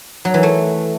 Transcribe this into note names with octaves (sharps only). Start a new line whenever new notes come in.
F#3
E3
A3